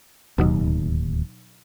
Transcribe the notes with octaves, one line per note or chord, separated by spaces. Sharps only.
D1 D#2 B2 F#3 D#4